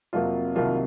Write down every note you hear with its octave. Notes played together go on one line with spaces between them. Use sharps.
F2 C3 F#3 A#3 F4
C2 C3 D#3 F#3 A#3 F4